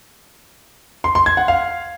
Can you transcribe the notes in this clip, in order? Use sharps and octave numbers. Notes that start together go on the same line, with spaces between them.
C6
C6
G#6
F#5
F5